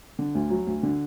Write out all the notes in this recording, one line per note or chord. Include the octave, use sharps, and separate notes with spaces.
D3
D2
F#3
D2
D3